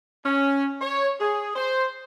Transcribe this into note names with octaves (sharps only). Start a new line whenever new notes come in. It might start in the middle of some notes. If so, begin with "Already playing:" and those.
C#4
C#5
G#4
C5